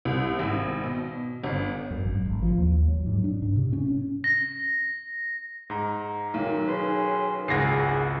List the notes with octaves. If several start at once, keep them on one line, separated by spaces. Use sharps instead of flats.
C2
G#1
B2
G1
F#2
G#1
G#1
F3
D#2
F#3
G#2
D4
G#2
C3
C#4
C#4
A#6
G#2 A#5
B1 D#3
C#4 G#4 B4 C6
G#1 C#2 G#4 F#5 A#6 C7